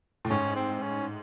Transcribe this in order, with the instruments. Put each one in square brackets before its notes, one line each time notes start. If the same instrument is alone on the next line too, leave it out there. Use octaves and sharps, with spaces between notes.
[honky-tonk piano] A2
[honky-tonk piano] G#2 [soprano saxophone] C#4
[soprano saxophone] C4
C#4